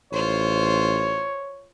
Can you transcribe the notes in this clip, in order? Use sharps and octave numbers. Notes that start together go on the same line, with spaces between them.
A1 F4 C5 C#5